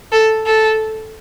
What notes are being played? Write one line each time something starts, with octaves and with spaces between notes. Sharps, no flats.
A4
A4